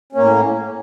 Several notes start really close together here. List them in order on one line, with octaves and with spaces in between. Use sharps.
C#4 A#3 A2